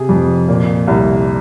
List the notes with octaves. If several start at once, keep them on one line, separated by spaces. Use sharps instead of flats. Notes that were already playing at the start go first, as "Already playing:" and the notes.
Already playing: C3 G#4
F2
A#2
C2